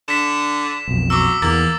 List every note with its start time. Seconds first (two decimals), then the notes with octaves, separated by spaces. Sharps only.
0.08 D3 B6 E7
0.88 B1 F2
1.10 F#3 D6 E6
1.42 E2 E3 A#3 A6